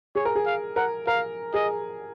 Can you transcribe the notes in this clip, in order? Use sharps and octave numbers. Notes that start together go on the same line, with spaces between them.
G#4 C#5
A#4
G#4
F5
A#4 F#5
A#4 F5
G#4 D#5